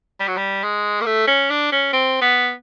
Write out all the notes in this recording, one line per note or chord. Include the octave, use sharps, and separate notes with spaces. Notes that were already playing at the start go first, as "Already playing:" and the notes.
G3
F#3
G3
G#3
A#3
A3
C#4
D4
C#4
C4
B3